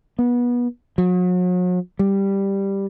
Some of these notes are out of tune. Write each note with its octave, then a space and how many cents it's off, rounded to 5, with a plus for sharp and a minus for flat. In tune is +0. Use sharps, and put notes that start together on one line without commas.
B3 -25
F#3 -40
G3 +5